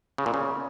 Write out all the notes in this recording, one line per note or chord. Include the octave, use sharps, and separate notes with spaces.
C#3
A#2
C#3